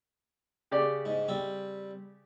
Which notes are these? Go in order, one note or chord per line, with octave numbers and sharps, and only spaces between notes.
C#3 G4 D5
G#2
G3 C4